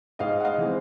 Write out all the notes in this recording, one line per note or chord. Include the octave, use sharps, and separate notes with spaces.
G#2 D#5 F5
F#5
D#5 F5
E3 G#3 C4